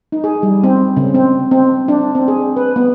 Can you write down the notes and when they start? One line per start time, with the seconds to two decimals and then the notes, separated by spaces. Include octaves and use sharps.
0.12 D#4
0.24 G#4
0.43 G3
0.64 C4
0.97 C#3
1.14 C4
1.51 C4
1.88 D4
2.15 C4
2.28 G#4
2.56 B4
2.76 B3